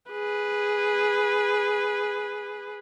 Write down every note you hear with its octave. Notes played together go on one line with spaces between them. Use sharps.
G#4 B4